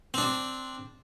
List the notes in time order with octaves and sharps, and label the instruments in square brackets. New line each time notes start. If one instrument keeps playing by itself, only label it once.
[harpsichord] C4 D4